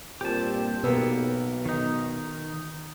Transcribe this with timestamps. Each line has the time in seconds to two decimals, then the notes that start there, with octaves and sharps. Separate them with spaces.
0.21 G2 A#2 C4 G4 A5
0.83 B1 B2 A#3 B3 E6
1.66 D#3 D#4